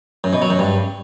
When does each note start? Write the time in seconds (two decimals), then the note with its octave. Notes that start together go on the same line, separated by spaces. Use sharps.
0.24 F#2
0.33 B2
0.42 F#3
0.50 F#2
0.59 G2